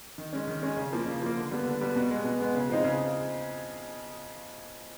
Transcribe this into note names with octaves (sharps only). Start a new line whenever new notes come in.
D#3
G#3 C#4
D#3
G#3 C#4
C#3
F3 A#3
C#3
F3 A#3
D3
G3 B3
D3
G3 B3
B2
G#3 B3
B2
G#3 B3
C#3
F3 G#3 C4 D#4
C#3